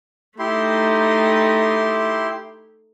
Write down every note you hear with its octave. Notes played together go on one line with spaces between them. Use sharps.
A3 D#4 E4 G4 C6